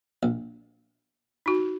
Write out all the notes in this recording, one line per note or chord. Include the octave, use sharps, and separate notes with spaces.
A#1
D#4 F#4